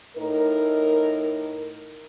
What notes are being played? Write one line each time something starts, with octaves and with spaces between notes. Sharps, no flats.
A2 D#4 A#4